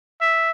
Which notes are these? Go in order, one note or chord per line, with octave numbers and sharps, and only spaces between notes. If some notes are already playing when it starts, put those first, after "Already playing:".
E5